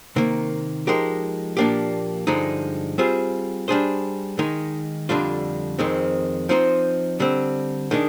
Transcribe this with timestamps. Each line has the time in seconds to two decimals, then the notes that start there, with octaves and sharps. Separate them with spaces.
0.16 C3 D#3 A#3
0.87 F3 G#3 D#4 G4 A#4
1.57 A#2 F3 A#3 D4 G4
2.27 G2 D3 F3 G#3 D#4
2.98 G3 C4 F4 G#4 C5
3.68 G3 D4 G#4 C5
4.39 D#3 G#3 D#4
5.09 F2 D3 G3 D4 F4
5.79 F2 D#3 G#3 C4
6.49 F3 C4 D#4 G4 C5
7.20 D3 G3 C4
7.91 D#3 G#3 D4